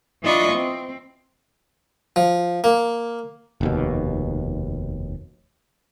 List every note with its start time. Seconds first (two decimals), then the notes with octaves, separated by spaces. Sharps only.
0.23 E3 D4 F4 D#5 B5 C#6
0.51 C4
2.16 F3
2.64 A#3
3.61 F1 D#2 B2